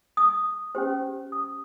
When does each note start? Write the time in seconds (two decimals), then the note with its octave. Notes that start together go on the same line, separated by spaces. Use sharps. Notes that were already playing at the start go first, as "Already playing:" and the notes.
0.17 D#6
0.75 C#4 G4 C5
1.32 D#6